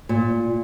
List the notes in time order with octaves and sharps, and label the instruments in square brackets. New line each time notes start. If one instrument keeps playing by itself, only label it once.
[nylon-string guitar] A#2